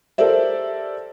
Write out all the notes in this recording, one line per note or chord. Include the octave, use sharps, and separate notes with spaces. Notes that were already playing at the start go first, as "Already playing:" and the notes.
G4 A4 A#4 C5 D5 E5